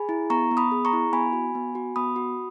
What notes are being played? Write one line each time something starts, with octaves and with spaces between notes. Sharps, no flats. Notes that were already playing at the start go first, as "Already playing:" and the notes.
Already playing: G#4 G#5 B5
E4
B3 A#5 C#6
B3
B5 D#6
G#4
A#5 C#6
E4
B3 G#5 B5
F#4
B3
F#4
B3 B5 D#6
F#4